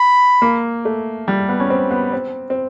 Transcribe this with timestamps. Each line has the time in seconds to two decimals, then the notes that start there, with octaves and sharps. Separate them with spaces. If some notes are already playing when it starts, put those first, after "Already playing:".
Already playing: B5
0.42 A#3
0.85 A3
1.28 G3
1.49 B3
1.60 C#4
1.70 C4
1.91 B3
2.12 C4
2.50 C4